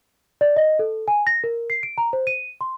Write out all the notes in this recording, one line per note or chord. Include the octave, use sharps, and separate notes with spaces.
D5
D#5
A4
G#5
A#6
A#4
C7
D7
A#5
C5
D#7
C6